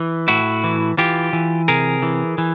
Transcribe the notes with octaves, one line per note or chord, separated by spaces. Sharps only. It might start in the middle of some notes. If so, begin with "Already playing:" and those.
Already playing: E3
A2 E4 F#4
E3
E3 F4 G4
E3
C3 G#4 A#4
E3
E3